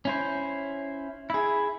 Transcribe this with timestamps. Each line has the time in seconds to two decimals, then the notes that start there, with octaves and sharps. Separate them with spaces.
0.05 C#4 E4 C5
1.30 E4 G#4